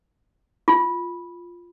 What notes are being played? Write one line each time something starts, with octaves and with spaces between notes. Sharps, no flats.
F4